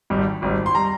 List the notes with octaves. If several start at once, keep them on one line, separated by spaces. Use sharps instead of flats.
G#1 G#2 G3
G#1 G#2 G3
C6
G3 A#5